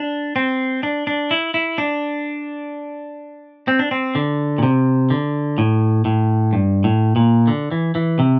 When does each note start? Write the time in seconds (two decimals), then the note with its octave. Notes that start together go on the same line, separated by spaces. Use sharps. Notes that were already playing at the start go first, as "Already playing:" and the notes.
Already playing: D4
0.36 C4
0.83 D4
1.07 D4
1.31 E4
1.54 E4
1.78 D4
3.68 C4
3.79 D4
3.91 C4
4.15 D3
4.58 A#2
4.63 C3
5.10 D3
5.58 A2
6.05 A2
6.53 G2
6.84 A2
7.16 A#2
7.47 D3
7.71 E3
7.95 E3
8.19 C3